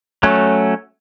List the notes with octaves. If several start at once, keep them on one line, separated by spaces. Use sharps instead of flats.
F#3 A3 C#4